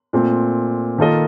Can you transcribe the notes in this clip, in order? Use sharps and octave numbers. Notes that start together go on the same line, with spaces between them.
A#2 A3 C4
D#3 A#3 F4 A4 D#5